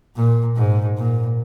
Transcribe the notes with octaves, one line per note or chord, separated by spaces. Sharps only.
A#2
G#2
A#2